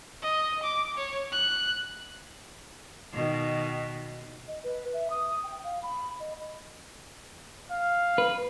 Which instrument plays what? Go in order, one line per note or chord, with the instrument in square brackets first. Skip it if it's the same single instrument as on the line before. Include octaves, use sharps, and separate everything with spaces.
[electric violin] D#5
D6
C#5
F#6
[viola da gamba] B2 D#3
[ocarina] D#5
B4
E5
D#6
G5
F5
B5
D#5
[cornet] F5
[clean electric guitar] B4